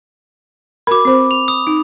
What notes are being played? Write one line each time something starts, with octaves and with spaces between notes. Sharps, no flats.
F#4 A#4 B5 D6
C4 C5
F7
D#6
D#4